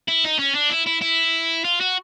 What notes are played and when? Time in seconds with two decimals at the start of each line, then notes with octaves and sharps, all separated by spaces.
0.08 E4
0.25 D#4
0.39 C#4
0.55 D4
0.70 E4
0.87 E4
1.02 E4
1.64 F4
1.80 F#4